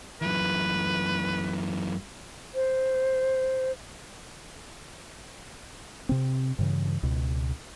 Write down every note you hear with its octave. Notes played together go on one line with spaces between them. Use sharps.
F#2 E3 B4
C5
C3 C4
G2 C#3 E3
C#2 B2